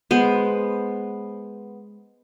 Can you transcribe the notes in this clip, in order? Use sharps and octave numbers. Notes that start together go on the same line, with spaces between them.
G#3 B3 C5